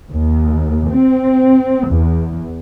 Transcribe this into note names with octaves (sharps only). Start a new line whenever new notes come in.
D#2
C4
E2